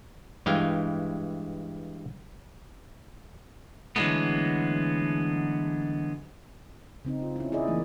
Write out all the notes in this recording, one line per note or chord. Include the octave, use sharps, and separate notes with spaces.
G2 E3 G#3 F5 G5
D3 E3 F#3 G#3 A3 B3
C#3 C4 D#4
F4
C#4 E4
E4 G#4 D5 D#5
E3 A3 A#3 D#4